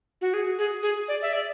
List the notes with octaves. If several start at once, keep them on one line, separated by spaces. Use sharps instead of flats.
F#4
G#4
G#4
G#4
D5
E5
D5